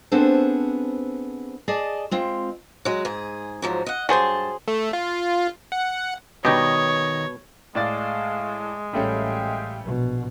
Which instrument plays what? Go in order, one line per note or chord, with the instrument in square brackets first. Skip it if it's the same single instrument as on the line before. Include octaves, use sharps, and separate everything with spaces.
[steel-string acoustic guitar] B3 C4 D4 G#4 A4 C5
G#4 D5 D#5 A5
G#3 C4 F4
F#3 G#3
G#2 G#4
G#2 F3 F#3
D#5 F#5
[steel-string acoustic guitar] G2 A5 [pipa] F#3 G#4 C5
[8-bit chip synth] A3
F4
F#5
[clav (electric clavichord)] B2 [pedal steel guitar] D#3 D#5 [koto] G3 D#4 G4 [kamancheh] C#5
[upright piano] A2 D5 A6 [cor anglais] G#3 [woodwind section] F5
[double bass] A1 [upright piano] G3 A3 C#4 [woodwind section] E5 F5 G5
[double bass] A#1 B2